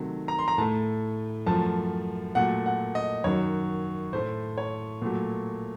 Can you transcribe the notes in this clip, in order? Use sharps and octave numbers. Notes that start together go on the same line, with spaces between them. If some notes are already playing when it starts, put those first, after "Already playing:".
Already playing: C3 D#3 F#3 A3
A#5
C6
A#5
A2 A3 A5
F#2 F3 A3 A5
A#2 F#3 A3 F#5
F#5
D#5
F#2 D#3 F#3 C#5
A2 A3 C5
C#5
A#2 F#3 A3